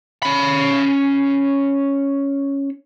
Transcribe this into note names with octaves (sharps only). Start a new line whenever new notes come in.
C#4 B5